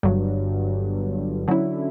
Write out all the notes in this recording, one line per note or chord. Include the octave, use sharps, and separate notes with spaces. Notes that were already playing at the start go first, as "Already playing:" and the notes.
G1 G2 D3 F#3
D3 F#3 C#4 E4